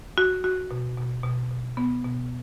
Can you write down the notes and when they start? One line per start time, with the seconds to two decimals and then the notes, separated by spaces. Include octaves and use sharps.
0.18 F#4
0.44 F#4
0.71 B2
0.97 B2
1.24 B2
1.51 B2
1.77 B3
2.04 B2